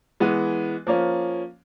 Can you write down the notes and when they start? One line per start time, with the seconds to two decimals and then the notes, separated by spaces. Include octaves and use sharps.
0.20 E3 G#3 B3
0.87 F3 A#3 C#4